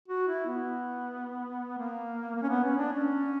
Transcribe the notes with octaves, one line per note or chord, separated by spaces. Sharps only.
F#4
E4
B3
A#3
A#3
C#4
B3
C#4
D4
C#4